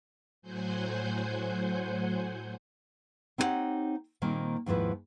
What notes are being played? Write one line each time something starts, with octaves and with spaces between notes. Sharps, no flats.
A2 F#3 C5 F#5 G#5 G6
C4 D#4 E4 G4 C#5 F#5
A#2 D#3 G3 A#3 C4
D#2 G#2 F3 E4 B4